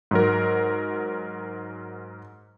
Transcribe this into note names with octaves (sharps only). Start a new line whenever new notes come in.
G#2 F#3 A#4